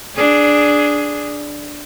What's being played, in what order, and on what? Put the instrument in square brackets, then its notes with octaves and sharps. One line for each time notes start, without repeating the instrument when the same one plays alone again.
[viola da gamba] D4 G#4